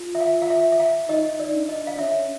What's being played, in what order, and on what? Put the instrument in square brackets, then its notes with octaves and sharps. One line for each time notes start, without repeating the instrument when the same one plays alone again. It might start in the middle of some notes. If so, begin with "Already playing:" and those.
Already playing: [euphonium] F4
[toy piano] E5
F5
F5
E5
E5
F5
[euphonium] D#4 [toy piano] D#5
[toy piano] D5
[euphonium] D4
[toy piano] D#5
F5
[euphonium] C#4 [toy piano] E5